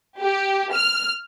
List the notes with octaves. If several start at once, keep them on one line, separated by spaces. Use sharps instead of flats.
G4
F6